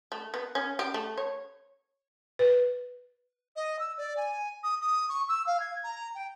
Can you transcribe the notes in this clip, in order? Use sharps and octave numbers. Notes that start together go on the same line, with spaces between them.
A3
B3
C#4
G4
A3
C#5
B4
D#5
E6
D5
G#5
D#6
D#6
C#6
E6
F5
G#6
A#5
G5